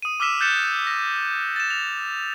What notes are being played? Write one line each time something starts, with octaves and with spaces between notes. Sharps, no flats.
D#6 D#7
D6 E6 F6 B6 E7
F#6 G6 A6 B6 C#7 E7
A#6
A6 E7
F7